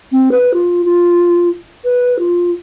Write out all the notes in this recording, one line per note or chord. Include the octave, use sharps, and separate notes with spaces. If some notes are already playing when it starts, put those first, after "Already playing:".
C4
B4
F4
F4
B4
F4